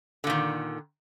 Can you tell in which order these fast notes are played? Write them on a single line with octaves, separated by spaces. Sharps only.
D3 A#2 D#3